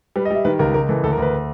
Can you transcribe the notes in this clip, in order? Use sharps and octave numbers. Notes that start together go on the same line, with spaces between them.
G3 B4
D#5
G3 E5
D#3 B4
C#2 A#4
C#2 A#4
E3 A4
D2 A4
A#4
D2 B4